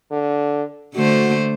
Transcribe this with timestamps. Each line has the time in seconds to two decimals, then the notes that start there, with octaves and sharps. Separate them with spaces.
0.11 D3
0.95 D3 A3 F#4 C5